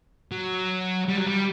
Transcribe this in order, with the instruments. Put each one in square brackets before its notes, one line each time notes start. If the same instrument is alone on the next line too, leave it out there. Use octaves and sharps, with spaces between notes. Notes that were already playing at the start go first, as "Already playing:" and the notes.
[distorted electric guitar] F#3
G3
F#3
G3